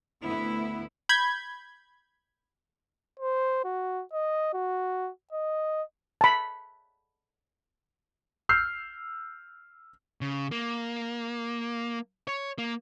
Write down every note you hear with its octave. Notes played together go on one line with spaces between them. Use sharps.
D2 B3 E4
B5 G6 G#6
C5
F#4
D#5
F#4
D#5
A5 B5
E6 F6 G6 C7
C#3
A#3
C#5
A#3